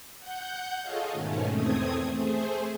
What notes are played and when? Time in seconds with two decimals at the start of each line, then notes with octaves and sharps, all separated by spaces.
0.19 F#5 G6
0.81 F4 G#4 A4 C#5 D#5 F5
1.11 G#2 B2 D#3 A3 C#4
1.51 E2 A3 C4 D#6 G#6
2.11 A3 G#4 C5